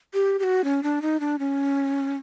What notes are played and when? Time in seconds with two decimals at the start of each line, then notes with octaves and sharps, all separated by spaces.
0.14 G4
0.39 G4
0.43 F#4
0.64 C#4
0.83 D4
1.02 D#4
1.20 D4
1.39 C#4